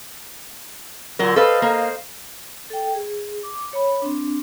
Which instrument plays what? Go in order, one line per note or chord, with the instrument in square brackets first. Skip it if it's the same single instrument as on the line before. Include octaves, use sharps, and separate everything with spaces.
[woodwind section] A#2 D3 [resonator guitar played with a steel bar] F#3 A#4
[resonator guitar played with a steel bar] A4 B4 [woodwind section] C5 D#5 F5
[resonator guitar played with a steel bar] A#3
[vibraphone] A4 G5
G#4
D6
C#5 B5
C4 D4